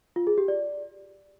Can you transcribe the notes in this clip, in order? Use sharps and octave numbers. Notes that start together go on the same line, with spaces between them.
F4
G#4
G4
D5